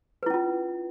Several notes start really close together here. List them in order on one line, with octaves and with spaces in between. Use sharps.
B4 E4 C#4 F4